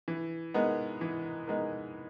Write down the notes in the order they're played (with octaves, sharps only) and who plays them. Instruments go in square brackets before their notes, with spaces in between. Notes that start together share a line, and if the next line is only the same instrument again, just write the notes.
[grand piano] E3
G#3 B3 D#4 A#4
E3
G#3 B3 D#4 A#4